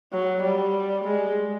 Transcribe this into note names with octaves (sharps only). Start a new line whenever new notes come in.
F#3
G3
G#3